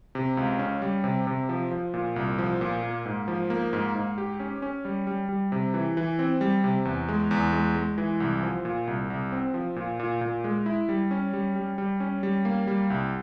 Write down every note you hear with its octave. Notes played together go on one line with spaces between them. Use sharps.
C3
C#2
C#4
G3
C3
C3
F3
F3
A#2
C2
F3
A#2
A#3
G#2
F3
A#3
G#2
G#2
G4
C#4
C#4
G3
G3
G3
C3
E3
E3
C4
G3
C3
E2
G#3
E2
G#3
G#3
E3
C2
F3
A#2
C2
C2
C4
F3
A#2
A#2
A#2
G#3
E4
G3
C#4
G3
G3
G3
C#4
G3
A#3
G3
C2